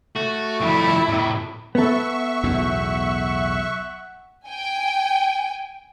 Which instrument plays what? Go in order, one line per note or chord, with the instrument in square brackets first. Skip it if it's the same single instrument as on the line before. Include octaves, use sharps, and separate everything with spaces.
[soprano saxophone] A3 [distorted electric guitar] F#4
[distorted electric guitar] F2 G3 [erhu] E4
[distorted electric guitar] A2 C3
[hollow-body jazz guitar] B3 A4 [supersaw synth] E5 C#6 [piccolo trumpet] F#5
[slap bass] B1 E2 A2
[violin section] G5 G#5